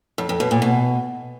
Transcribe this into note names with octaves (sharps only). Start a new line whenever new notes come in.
F2
F2
B2
A#2
B2